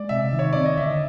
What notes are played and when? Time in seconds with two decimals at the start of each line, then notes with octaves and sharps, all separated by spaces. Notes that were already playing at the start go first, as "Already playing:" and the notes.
Already playing: G#3 D5
0.09 C3 E5
0.33 D#3
0.39 C#5
0.53 C4 D5
0.65 D#5
0.77 D3 E5